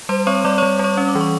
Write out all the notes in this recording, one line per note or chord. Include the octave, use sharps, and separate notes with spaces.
G3 C5 C6
C4 C#5 C#6
G3 D5 D6
G3 C#5 C#6
G3 C#5 C#6
C#4
D6
E3
C#6